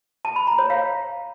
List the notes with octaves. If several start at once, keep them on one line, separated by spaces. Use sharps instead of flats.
A5
B5
A#5
C#5
F5